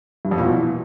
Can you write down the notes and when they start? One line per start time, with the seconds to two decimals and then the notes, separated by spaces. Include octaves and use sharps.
0.25 G2
0.31 F2
0.38 A#2
0.45 B2
0.51 E3